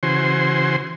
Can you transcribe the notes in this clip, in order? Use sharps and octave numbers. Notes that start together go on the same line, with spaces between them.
C#3 E3 F#4 C5 G#5 C6